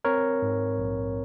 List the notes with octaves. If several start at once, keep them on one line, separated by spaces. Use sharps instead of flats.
C4 A#4 C#5
G#2
A#1